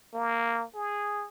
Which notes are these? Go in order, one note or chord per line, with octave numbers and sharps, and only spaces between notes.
A#3
G#4